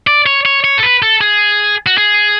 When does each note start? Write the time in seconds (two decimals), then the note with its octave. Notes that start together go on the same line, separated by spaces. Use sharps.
0.07 D5
0.26 C#5
0.46 C#5
0.64 C#5
0.78 A4
0.83 B4
1.02 A4
1.21 G#4
1.86 F#4
1.98 G#4